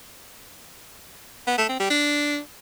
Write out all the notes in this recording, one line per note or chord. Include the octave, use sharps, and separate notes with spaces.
B3
A3
C4
G3
D4